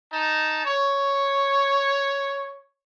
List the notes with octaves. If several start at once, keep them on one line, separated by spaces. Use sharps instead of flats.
D#4 A5
C#5